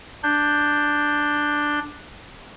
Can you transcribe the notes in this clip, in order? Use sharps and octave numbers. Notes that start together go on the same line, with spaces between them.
D4 G6